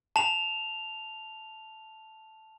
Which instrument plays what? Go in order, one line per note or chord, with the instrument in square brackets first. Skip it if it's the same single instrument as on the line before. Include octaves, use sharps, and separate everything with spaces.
[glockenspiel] A5 F7